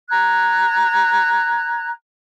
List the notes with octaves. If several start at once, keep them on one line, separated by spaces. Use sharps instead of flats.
A#5 F#6 G#6